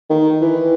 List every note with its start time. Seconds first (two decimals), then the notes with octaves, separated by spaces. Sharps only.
0.10 D#3
0.41 E3